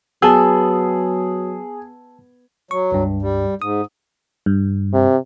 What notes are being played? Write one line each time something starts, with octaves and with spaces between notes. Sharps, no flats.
F#3 B3 G#4 A5 E6
F#3 C#6
C#2 G2
G3
G#2 D#6
G2
C3